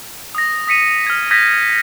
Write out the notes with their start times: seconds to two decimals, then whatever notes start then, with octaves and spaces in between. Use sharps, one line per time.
0.35 D#6 A#6
0.68 D#6 B6 C#7 D#7
1.07 F6 G#6
1.31 D#6 G6 G#6 A#6 B6